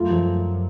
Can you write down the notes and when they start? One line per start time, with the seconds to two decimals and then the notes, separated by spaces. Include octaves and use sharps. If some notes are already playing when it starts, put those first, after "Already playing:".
Already playing: F#2 A3 F4
0.10 F3